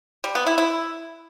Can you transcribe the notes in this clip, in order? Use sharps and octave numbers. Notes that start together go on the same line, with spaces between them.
G3
B3
E4
E4